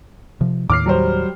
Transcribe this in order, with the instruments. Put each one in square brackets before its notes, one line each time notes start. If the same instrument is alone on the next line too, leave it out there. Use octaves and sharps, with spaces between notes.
[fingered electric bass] C3 F3
[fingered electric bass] D#2 A2 D#3 [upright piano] D6 F6 C7
[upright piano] F#3 G3 C5